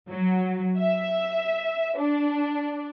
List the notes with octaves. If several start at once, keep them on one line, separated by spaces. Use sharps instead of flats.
F#3
E5
D4